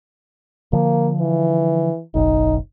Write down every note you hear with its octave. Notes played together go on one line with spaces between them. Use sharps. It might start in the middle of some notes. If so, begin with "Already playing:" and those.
D3 F3 A#3
E3
F#1 B1 D#4